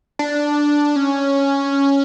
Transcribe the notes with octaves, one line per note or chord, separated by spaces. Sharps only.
D4
C#4